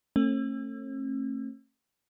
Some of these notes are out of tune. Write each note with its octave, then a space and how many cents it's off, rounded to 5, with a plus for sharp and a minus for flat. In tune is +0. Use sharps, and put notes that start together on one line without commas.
A3 +25 C#4 -45